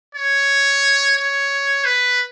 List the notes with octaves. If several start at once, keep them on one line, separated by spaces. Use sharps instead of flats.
C#5
C#5
B4